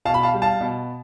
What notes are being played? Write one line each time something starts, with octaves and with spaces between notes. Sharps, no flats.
B2 F5 A5
B5
F5 A5
G3
F5 A5
B2